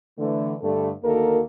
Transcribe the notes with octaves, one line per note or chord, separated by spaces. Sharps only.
D3 E3 A3
G2 D3 A3
D2 D#3 A#3 F#4 A4 A#4